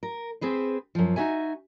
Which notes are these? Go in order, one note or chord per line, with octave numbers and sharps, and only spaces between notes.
A#4
C4 G#4 B4 C5
F#2 F3
D#4 F4 F#4 E5 G#5